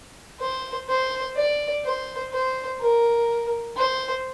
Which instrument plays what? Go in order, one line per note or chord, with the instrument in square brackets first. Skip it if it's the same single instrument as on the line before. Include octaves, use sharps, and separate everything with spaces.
[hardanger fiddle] C5
C5
D5
C5
C5
A#4
C5